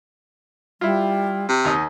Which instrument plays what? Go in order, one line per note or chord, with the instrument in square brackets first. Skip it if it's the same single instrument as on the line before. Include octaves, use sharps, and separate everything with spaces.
[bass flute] G3 [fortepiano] E4 F4
[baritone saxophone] C3
[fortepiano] D#2 D#4 D#5